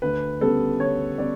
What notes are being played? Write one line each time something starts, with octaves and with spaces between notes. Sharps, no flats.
D2 B4
C#3 G3 B3 A4
D2 C#5
C#3 G3 B3 D5